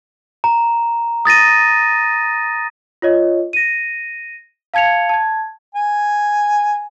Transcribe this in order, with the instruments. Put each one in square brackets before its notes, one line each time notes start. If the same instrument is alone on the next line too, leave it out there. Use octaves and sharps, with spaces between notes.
[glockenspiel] A#5
D#6 A6 A#6 D#7
[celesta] F4 C#5 D#5
A#6 D#7
F5 A5 G#6 C#7 F7
A5 G#6
[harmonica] G#5